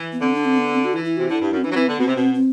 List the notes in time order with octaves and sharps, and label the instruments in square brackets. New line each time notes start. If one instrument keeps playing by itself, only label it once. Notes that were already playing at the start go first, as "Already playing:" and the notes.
Already playing: [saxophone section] E3
[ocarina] B3
[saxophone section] D3 [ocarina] C4
[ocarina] D4
C4
B3
C4
F#4
[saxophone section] E3 [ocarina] E4
[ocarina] E4
[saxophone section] C3 [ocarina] F#4
[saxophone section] D3 [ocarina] E4
[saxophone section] G2
F#2
[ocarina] C4
[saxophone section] E3 [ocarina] D4
[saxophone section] F#3
[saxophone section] E3 [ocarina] C4
[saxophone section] D3 [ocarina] B3
[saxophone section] B2 [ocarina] C4
[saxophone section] C3
[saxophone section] B2 [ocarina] C4
[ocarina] C4